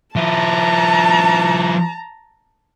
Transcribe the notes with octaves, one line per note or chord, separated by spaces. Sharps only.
F3 E4 A5 A#5